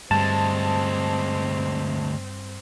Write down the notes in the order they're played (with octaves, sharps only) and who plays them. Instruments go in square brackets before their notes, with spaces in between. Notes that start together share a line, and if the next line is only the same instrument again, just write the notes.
[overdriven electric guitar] D2 G#3 [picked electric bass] G2 [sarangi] C4 [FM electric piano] A5